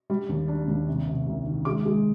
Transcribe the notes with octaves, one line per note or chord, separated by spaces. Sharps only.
G3
D#2
D4
D#2
C3
C3
C2
D#3
G#3 D6
G#3